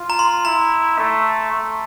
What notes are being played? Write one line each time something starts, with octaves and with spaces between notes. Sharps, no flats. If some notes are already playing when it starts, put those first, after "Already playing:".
Already playing: F4
A#5
C6
E4 A#5
A3
A3